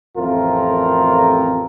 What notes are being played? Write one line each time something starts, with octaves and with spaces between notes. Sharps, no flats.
A1 F2 A3 C4 F4 A#4